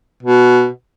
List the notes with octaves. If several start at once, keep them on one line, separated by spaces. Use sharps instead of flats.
B2